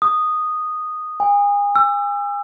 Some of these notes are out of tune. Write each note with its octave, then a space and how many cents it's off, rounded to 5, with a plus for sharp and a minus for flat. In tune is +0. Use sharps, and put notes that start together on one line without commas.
D#6 -5
G#5 -35
E6 +25